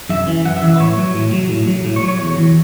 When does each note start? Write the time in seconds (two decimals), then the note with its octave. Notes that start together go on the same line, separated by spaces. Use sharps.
0.09 F#2 E5
0.27 E3
0.45 F#2 F#5
0.57 E5
0.63 E3
0.68 E5
0.76 B4
0.80 A2 C#5
0.98 F#3
1.15 A2
1.32 F#3
1.50 A2
1.67 F#3
1.85 A2
1.96 C#5
2.02 F#3
2.08 C#5
2.20 E2
2.37 E3